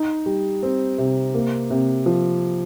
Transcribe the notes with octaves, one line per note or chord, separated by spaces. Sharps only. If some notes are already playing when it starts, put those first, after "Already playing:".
Already playing: D#4
G3
C4
C3
A#3
C3
F3